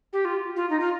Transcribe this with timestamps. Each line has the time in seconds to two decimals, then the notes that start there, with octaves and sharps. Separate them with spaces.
0.13 G4
0.25 F4
0.56 F4
0.70 D#4
0.80 F4